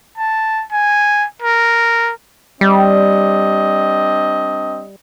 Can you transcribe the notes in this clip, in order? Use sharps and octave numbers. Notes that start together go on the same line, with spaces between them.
A5
G#5
A#4
G3 C4 D4 D#5